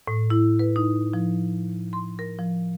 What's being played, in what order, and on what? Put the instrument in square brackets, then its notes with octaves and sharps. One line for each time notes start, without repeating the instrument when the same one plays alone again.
[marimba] A2
E4
B4
D#4
F3
C6
A#4
F3